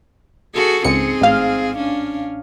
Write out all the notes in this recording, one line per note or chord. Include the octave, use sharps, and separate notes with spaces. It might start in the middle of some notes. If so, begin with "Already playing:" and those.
F#4 G#4 A4
C#2 G#2 C4 G#4 C#7
A1 F5
C#4 D4